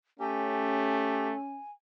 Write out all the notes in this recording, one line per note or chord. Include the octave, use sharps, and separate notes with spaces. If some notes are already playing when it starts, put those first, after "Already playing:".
A3 C#4 G4 G#5